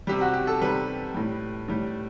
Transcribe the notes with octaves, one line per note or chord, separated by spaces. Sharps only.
C3 G3 G4
F#4
G4
A4
C3 G3 B4
A2 G3
A2 G3